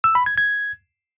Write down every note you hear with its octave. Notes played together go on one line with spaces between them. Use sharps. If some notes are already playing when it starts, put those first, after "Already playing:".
E6
B5
G#6
G#6